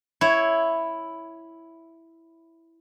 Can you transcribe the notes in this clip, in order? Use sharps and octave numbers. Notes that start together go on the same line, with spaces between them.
E4 C#5